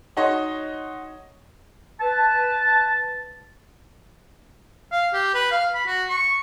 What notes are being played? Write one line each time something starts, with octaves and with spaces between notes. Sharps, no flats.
D#4 F#4 C#5 D#5 C6
B4 A5
F5
G4
B4
F5
B5
F#4
C#6